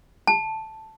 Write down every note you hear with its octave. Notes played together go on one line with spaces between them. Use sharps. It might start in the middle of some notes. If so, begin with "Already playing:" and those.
A5